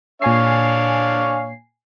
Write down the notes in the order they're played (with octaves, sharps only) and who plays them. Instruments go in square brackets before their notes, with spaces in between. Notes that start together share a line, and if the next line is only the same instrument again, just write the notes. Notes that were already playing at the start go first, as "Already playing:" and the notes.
[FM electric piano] A#2 G#5 C7 [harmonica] D4 C#5 F5